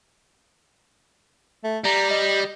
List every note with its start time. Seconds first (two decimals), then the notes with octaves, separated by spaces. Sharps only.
1.64 A3
1.85 G3 A#5
2.10 D#5